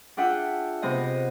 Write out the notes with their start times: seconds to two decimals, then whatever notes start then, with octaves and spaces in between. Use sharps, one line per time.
0.17 D4 F4 G#4 E5 F#5 G5
0.82 C3 B3 C5 D#5